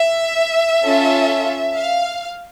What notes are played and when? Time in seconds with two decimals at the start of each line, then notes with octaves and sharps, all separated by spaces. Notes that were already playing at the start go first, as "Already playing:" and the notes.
Already playing: E5
0.82 C#4 F4 A4
1.76 F5